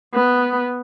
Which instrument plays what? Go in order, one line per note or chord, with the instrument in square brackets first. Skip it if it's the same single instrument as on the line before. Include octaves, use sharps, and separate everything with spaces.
[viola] B3